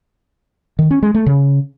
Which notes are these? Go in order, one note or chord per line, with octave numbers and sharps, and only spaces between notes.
D#3
C#4
G#3
A3
C#3